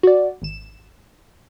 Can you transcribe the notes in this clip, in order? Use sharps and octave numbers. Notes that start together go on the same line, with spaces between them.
F#4 D5
G#1 E7